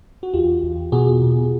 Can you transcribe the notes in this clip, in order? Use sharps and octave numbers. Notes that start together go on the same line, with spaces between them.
F#4
E2 F4 G4
E2
B2 F#4 G#4
B2